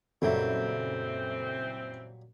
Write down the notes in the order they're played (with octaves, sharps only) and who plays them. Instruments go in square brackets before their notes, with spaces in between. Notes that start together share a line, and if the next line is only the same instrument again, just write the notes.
[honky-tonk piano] F#1 E5 [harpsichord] A#2 F#3 G3 [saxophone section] E3 C4 [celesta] A4